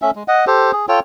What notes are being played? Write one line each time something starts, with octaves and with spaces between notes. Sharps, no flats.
A3 C#4 E5
G#3
D#5 F#5
G4 A4 C5
G#4
F4 A4 C#5 G5